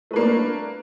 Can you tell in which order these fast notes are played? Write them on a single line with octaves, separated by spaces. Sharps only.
A3 B4 A#3 D4